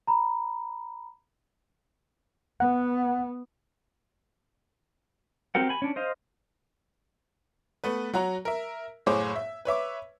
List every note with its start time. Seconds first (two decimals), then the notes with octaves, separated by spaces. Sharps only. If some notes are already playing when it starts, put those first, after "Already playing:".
0.07 A#5 B5
2.60 B3 F#5
5.55 C4 F#4 G4 A#4 F#5
5.69 G#5 B5
5.82 C#4 D4
5.96 C5 D#5 F5
7.84 A3 B3 B4
8.13 F#3 F#4 A#5
8.45 A#4 E5
9.06 F#1 A2 G#4 C5 C#5 D6
9.36 E5
9.65 B4 C#5 E5 D6